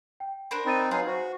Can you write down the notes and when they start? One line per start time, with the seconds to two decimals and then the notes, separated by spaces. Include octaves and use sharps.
0.20 G5
0.51 D4 A#4 C5 B5 E7
0.66 C4 D#4 B5 A6 D#7
0.91 F#3 D#4 G#4 B4 F5 C6
1.07 F#4 C5